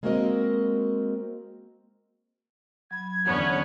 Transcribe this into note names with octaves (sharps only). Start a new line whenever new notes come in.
G#3 A#3 C4 F#4 A#4 D#5
F#3 B5 G#6
E2 D3 B3 C#4 C#5